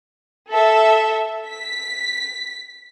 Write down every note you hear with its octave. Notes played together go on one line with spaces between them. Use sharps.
A4 E5
B6